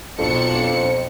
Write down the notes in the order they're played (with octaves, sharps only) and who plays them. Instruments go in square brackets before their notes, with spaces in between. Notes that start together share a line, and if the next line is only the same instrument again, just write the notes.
[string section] B1 D4 C#7 [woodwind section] F2